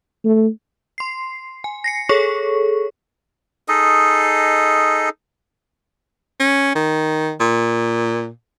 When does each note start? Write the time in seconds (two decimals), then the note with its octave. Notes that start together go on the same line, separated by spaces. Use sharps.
0.24 A3
0.98 C6 C7
1.64 G#5
1.84 A#6 C7 C#7
2.09 G#4 A4 C#5 C#6
3.68 D#4 G#4 A4 D#5
6.40 C#4
6.75 D#3
7.40 A#2